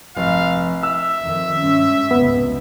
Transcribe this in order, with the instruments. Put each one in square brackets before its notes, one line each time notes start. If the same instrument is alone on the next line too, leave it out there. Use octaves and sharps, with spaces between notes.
[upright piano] F1 [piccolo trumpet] F5
[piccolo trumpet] E5 [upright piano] E6
[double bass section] F2 D#3
G2 G#3 C#4
[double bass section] F1 C#2 G#2 [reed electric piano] B3